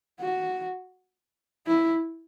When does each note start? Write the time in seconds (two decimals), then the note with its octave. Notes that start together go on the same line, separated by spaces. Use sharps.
0.20 F#4
1.67 E4